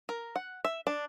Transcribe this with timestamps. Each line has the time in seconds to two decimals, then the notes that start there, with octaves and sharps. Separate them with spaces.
0.09 A#4
0.36 F#5
0.65 E5
0.87 D4